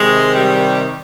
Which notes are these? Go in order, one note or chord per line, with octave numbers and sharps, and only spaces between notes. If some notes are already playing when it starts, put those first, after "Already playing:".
Already playing: C3 D#3 G#3
G3